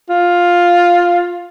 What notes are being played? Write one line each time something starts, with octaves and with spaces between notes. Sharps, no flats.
F4